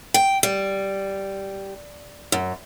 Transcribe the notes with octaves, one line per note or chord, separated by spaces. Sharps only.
G5
G3
F#2